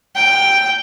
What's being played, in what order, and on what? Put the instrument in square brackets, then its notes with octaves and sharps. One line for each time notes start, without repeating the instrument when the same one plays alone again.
[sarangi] G5